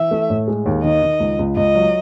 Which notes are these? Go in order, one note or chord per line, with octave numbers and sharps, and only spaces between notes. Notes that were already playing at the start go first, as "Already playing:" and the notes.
Already playing: E3 E5
A3
A2
G#3
D#2
D#3 D#5
D#3
C#2
C#2
C#2 D#5
F#3